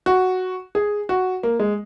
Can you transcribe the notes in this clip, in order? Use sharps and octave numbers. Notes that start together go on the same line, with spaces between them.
F#4
G#4
F#4
A#3
G#3